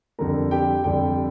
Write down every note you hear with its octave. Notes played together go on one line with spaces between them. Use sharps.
F2 D3 G3 A#4 A#5
G4 G5
F2 D3 G3 G4 G5